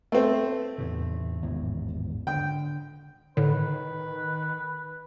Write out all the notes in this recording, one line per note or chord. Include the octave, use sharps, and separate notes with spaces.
A3 C4
E2 A2 C3
G#1 E2 A2
D3 G5
A2 D3 D#3 B4